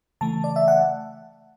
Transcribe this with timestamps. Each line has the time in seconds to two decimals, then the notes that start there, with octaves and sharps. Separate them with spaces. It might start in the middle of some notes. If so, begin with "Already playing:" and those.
0.21 C#3 E3 A3 A5
0.44 D5
0.56 E5
0.68 F#5